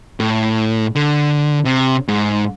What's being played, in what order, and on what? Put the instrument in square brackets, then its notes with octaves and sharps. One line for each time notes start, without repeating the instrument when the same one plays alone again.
[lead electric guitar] A2
D3
C3
G#2